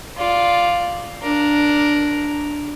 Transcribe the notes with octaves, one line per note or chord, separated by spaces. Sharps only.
F4 D5
D4 A#4